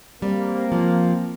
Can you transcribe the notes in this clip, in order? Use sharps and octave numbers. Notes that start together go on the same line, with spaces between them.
G3 A#3 C4
F3